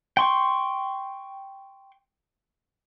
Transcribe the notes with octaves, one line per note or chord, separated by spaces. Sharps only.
G5 C6 C#6